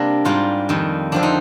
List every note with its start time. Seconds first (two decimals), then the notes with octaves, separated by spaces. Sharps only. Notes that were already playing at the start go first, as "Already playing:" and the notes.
Already playing: C3 G3 A#3 D4 A#4
0.25 G#2 G3 A#3 F4
0.69 F2 D#3 G3
1.12 D3 F3 C4 D4
1.23 D#4